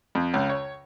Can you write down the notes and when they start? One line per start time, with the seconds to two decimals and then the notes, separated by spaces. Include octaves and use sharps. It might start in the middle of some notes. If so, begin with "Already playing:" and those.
0.15 F2
0.34 C#2
0.49 C#5